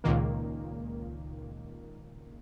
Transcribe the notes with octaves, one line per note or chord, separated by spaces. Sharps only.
C#2 A#2 D#3 A#3